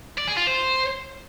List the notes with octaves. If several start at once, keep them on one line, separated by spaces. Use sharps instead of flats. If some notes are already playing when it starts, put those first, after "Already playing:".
D5
G#4
F4
C5